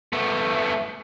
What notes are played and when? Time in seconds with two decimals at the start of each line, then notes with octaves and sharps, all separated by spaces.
0.13 A3 B3